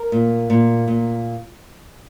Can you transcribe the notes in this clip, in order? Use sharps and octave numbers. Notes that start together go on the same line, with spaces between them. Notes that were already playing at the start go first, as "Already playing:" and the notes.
Already playing: A#4
A#2
A#2
A#2